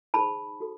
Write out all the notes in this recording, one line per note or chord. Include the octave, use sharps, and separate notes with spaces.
D#4 G#4 C5 A5 B5
F#4 A4